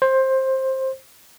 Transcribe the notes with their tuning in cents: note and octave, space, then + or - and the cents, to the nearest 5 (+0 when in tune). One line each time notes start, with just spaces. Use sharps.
C5 +15